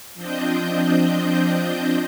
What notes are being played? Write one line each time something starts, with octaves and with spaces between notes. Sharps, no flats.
F3 C4 D4 D#5 G6